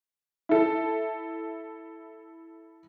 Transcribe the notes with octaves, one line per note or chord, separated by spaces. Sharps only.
E4 A4